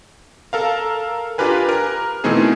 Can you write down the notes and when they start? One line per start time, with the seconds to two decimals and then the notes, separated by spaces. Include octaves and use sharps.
0.53 A4 A#4 F5
1.38 D4 F4 G4 A#4 B4 G#5
1.69 A#4
2.24 B2 E3 A3 C4 D#4 G#4